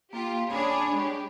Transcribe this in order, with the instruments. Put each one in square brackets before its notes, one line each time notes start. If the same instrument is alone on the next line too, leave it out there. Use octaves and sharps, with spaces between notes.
[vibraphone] A#3 [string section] F4 G4
[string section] D4 G#4 C#5 [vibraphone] B5
[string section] G#3 G4